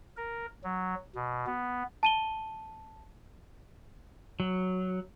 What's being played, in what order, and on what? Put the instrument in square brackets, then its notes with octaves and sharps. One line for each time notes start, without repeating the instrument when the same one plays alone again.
[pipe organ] A#4
F#3
B2
B3
[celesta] A5 D#7 G7
[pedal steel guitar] F#3